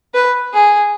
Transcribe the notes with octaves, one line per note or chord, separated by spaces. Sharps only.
B4
G#4